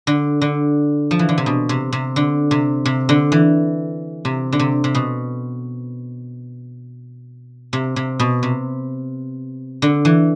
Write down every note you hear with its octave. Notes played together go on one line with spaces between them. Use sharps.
D3
D3
F3
E3
D3
C3
B2
C3
C3
D3
C3
C3
D3
E3
C3
D3
C3
C3
B2
C3
C3
B2
C3
D3
E3